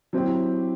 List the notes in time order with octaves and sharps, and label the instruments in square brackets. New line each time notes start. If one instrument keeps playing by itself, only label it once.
[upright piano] F#3 C4 E4 G4